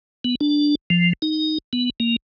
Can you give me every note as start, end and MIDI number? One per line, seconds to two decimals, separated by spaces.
0.24 0.35 59
0.41 0.75 62
0.90 1.13 53
1.22 1.58 63
1.73 1.90 59
2.00 2.16 58